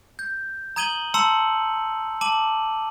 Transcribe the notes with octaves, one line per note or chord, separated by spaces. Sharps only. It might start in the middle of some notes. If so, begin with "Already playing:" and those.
G6
A#5 D#6 G#6 D#7 F#7 G7
A5 A#5 C6 E6 C#7 F#7
A5 D6 D#7 F#7